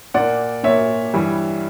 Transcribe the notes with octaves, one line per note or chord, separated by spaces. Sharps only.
A#2 A#3 D5 F#5
A#2 A#3 C#5 E5
G2 E3 G3